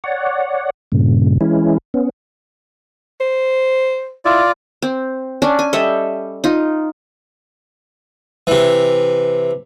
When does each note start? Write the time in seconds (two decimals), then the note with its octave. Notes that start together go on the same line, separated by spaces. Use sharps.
0.04 C#5 D5 F#5
0.92 G2 A#2 C#3
1.41 E3 G#3 C#4 E4
1.94 B3 C#4
3.20 C5
4.25 E4 F4 D5
4.82 C4
5.42 C#4 D4
5.59 G#5
5.73 G3 A4 D#5 E5
6.44 D#4 F4
8.47 C3 E3